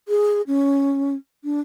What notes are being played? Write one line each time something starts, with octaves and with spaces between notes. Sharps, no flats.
G#4
C#4
D4